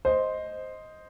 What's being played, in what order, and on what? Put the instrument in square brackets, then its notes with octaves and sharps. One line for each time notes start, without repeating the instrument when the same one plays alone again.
[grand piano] C5 D#5